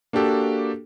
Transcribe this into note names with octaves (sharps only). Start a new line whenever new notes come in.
A#3 D4 F#4 G4 A4